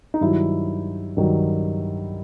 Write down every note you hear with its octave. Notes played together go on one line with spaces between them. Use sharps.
D#4
G2 D#3 F#3 E4
G2 D#3 F#3